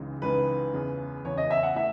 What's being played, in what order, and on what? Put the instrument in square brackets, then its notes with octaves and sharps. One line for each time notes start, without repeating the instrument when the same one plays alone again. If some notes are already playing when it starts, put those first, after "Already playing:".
Already playing: [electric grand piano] C#2 C#3 E3 G#3 D#4
[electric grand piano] C#2 C#3 E3 G#3 D#4 [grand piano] B4
[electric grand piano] E2 C#3 E3
[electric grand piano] E2 C#3 E3 [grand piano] C#5
[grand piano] D#5
E5
F#5
[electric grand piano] A3 E4 [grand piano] E5